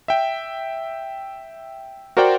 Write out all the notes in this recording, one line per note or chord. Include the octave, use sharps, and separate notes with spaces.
E5 G5
F#4 A#4 C5 D5 F#5 G5